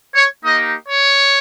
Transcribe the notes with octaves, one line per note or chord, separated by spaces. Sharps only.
C#5
A#3 D#4 G4 D#5
C#5